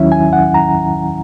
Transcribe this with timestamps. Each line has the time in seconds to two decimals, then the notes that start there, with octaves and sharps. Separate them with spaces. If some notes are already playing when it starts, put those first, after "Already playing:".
Already playing: D#2 D#3 F#3 C#4 E4 E5
0.12 G#5
0.33 F#5
0.54 A#5